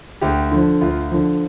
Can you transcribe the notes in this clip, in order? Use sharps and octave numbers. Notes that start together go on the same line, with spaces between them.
D2 G4
D3 F3
D2 F4
D3 F3